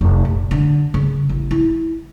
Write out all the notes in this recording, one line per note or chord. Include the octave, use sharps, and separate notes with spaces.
F1
A#1
D3
C#3
A1
E4